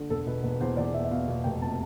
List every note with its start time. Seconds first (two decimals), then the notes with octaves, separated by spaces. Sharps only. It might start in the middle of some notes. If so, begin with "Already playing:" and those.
Already playing: D3
0.10 E1 A4
0.26 B2 B4
0.43 E1 B4
0.60 E2 C5
0.77 E2 D5
0.94 B2 E5
1.04 E5
1.11 B2 F5
1.28 B2 F5
1.44 F1 G5
1.61 C3 A5